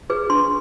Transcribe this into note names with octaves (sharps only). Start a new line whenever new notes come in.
G#4 B4
D4 C6